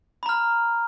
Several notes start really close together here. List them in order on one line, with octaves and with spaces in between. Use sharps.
B5 A#5 F6